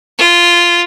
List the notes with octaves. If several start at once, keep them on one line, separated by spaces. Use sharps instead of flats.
F4